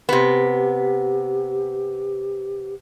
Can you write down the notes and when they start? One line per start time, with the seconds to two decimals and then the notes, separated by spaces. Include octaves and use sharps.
0.09 C3 B3 G4